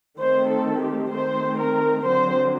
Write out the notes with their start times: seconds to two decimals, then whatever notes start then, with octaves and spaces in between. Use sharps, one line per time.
0.19 D#3 A3 C4 C5
0.50 A4
0.82 G4
1.13 D#3 A3 C4 C5
1.60 A#4
2.07 D3 F#3 C4 C5